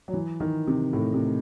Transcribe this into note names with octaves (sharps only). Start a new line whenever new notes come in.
F#3
E3
D#3
C3
A2
C3